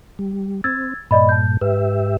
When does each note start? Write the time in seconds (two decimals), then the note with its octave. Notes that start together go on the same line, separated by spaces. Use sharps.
0.19 G3
0.64 C4 E6 G#6 A6
1.11 G2 A#2 D5 D#5 B5
1.29 A5 G6
1.61 G#2 G4 B4 E5